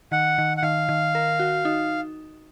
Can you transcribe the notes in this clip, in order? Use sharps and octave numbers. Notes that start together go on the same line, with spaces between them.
D#3 F#5
D#3
F#5
D#3 F5
D#3
A#4
F#4
D#4